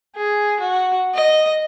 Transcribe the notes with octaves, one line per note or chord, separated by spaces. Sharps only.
G#4
F#4
D#5